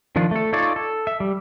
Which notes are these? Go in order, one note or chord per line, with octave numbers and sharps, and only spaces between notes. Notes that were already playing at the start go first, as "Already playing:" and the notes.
D#3 F3 D4 F4
A3 A4
D#4 F4 A4 C#5 D5
A4
E5
G3